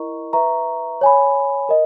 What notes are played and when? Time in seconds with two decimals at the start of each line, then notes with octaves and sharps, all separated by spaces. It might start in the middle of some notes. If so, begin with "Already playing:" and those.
Already playing: E4 A#4 D#5 A#5 C#6
0.33 B4 E5 A#5 C#6
1.01 C#5 G#5 B5
1.69 A#4 D#5